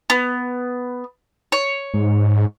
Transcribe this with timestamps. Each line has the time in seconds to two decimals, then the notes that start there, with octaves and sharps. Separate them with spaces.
0.10 B3
1.52 C#5
1.94 G#2